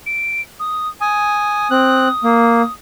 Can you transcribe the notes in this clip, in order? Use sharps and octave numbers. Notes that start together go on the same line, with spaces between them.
D7
D#6
G#5 D#6
C4 F#6
A#3